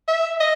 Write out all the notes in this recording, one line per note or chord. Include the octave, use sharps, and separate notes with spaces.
E5
D#5